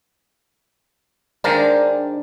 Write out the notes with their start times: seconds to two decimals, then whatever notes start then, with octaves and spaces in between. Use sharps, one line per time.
1.44 D#3 G#3 D4 A#4 C5 D5 F5